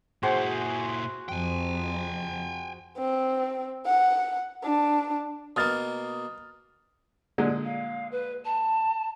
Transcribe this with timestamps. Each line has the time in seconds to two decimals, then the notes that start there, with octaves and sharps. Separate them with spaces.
0.23 A#2 E4 F#4 G#4 C5
1.29 F2 G5 G#5
2.98 C4
3.86 F#5
4.64 D4
5.56 B2 A#3 D#6 F6 A6
7.38 A#2 D3 G#3
7.64 F5
8.12 B4
8.45 A5